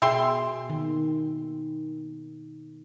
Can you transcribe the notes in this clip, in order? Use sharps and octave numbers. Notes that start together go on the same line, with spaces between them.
B2 G#4 E5 G5 C6
D#3